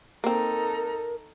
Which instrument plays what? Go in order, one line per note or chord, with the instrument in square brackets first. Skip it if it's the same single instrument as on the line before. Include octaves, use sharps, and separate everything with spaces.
[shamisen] A#3 C4 [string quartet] D#4 A4 A#5 [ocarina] A#4